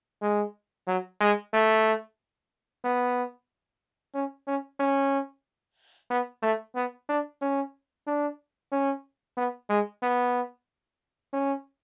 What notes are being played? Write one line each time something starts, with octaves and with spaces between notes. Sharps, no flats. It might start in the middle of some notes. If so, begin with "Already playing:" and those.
G#3
F#3
G#3
A3
B3
C#4
C#4
C#4
B3
A3
B3
D4
C#4
D4
C#4
B3
G#3
B3
C#4